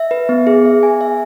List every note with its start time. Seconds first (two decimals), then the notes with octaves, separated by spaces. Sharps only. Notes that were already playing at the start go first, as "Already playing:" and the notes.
Already playing: E5
0.11 B4
0.29 B3
0.47 G#4
0.65 E5
0.83 G#5
1.01 E5